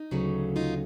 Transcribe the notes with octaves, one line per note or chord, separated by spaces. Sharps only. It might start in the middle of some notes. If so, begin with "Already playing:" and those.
Already playing: D#4
D2 C#3 F#3 A3
D#4 F4